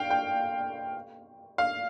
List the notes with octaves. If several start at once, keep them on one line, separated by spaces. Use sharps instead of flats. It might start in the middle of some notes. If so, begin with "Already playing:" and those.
Already playing: F5 G5
G5
F5